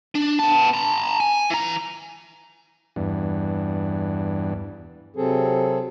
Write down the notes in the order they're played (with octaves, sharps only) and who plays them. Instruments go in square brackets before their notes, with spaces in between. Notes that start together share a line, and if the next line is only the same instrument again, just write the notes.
[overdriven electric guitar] D4
B3 A5
A5 A#5
G#5
E3 A#5
[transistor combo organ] E2 G2
[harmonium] C3 F#3 C4 G#4 A4